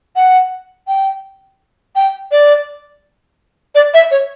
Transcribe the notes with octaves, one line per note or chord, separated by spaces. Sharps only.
F#5
G5
G5
D5
D5
E5
C#5